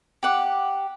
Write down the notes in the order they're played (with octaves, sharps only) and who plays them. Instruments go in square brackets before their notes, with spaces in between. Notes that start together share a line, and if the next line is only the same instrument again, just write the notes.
[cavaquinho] G4 F#5 D6